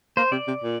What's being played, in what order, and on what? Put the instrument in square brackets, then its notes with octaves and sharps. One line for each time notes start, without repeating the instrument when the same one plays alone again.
[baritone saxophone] A#3 [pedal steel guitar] C5
[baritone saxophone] C3 [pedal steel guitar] D5
[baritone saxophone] C3
A#2